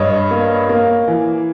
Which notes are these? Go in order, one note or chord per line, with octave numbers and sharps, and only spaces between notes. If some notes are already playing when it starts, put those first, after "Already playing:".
Already playing: G2 C#5 D#5
A#3
A#3
E3